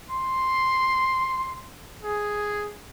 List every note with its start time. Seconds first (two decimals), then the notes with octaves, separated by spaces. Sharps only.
0.11 C6
2.04 G#4